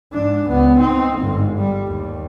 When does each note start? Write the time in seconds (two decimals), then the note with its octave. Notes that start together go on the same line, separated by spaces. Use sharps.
0.12 G#2 D4
0.49 C#2 B3
0.80 C4 D#4
1.19 G1 G#2
1.58 G3
1.87 D#2